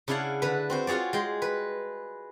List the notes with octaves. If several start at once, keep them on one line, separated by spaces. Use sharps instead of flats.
C#3 D4 E4 D5 F5 F#5
D3 B4
C4 F#4 C5
F4 F#4 G#4 C#5 D5
G#3 G5 C6
B4